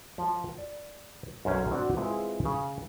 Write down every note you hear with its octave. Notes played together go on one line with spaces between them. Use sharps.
F3
D5
B1 F#2 C#4 C5
C4 D4 F#4
G#3 C4 E4 F4 G#4 B4
C#3